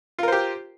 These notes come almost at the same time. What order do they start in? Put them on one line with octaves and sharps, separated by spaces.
F4 A#4 C5 G4